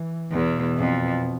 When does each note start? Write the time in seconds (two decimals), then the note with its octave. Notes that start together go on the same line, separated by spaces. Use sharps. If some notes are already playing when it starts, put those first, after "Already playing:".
Already playing: E3
0.31 E2 B2
0.78 F2